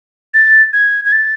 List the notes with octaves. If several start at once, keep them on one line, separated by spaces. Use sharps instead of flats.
A6
G#6
G#6
A6